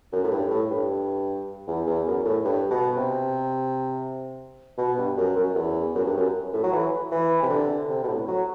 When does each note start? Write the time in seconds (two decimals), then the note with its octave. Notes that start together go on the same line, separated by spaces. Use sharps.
0.12 F#2
0.24 A2
0.31 G2
0.50 A2
0.71 G2
1.67 E2
1.87 E2
2.06 F#2
2.25 A2
2.45 G2
2.71 B2
2.97 C3
4.78 B2
4.98 G2
5.18 F#2
5.36 F#2
5.55 E2
5.95 F#2
6.05 G2
6.16 F#2
6.53 A2
6.63 F#3
6.72 E3
7.11 E3
7.42 C3
7.49 D3
7.88 C3
8.03 B2
8.08 A2
8.28 F#3